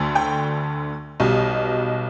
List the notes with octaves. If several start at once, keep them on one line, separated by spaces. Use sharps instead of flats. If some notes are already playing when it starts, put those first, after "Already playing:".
Already playing: D2 D3 A3
G5
B1 B2 G3